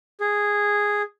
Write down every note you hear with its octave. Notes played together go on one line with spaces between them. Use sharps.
G#4